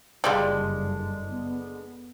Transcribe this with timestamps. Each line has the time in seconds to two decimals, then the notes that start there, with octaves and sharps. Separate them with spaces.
0.24 F#1 G2 D3 G3 G#3 F4
1.27 B3